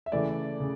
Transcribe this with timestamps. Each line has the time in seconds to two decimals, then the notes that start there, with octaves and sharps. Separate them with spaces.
0.06 E5
0.12 C#3 E3 A3 D5
0.60 C#3